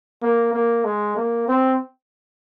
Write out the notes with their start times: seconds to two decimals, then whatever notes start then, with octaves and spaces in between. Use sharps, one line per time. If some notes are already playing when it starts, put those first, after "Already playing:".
0.22 A#3
0.53 A#3
0.84 G#3
1.16 A#3
1.48 C4